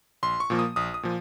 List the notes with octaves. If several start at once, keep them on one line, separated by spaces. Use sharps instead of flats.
A#1 C6
C#6
A#2 F3 A#3
D#6
A#1 D#6
D#6
A#2 F3